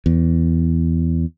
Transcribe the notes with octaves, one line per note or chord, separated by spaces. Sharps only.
E2